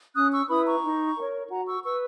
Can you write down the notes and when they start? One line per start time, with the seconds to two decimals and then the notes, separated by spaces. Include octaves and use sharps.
0.16 C#4 D#6 F#6
0.32 C#6 E6
0.49 E4 B4 B5 D#6
0.65 A#5 C#6
0.83 D#4
1.17 A#4 C#5
1.50 F#4 F#5 A#5
1.67 C#6 E6
1.83 B4 C#6 E6